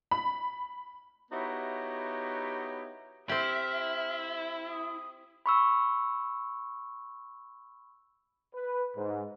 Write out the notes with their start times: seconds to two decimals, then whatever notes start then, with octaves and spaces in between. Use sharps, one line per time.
0.11 B5
1.31 B3 D#4 E4 F#4 G4 C#5
3.29 C4 E4 G4 E5 F6
4.70 D#6
5.46 B5 C#6 E6
8.55 B4
8.95 G#2